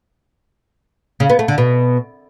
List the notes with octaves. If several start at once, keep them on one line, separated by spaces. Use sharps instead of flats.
C#3
B3
A3
D3
B2